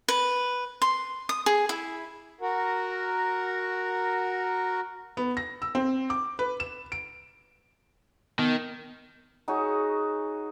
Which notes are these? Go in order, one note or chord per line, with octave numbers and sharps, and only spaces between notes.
B4
C6
D#6
G#4
E4
F#4 A#4
B3
A#6
E6
C4
D6
B4
E7
D7
D#3 B3
D#4 F#4 G#4 C#5